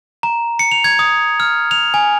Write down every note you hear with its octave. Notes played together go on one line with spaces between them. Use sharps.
A#5
C#7
F7
G#6
D#6
F6
F7
G#5